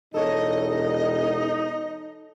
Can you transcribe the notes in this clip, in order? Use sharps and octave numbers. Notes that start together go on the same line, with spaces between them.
E1 D#4 A4 C#5 D#5